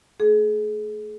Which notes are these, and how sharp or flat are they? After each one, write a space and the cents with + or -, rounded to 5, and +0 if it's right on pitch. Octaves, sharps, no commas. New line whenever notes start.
A3 +15 G#4 +35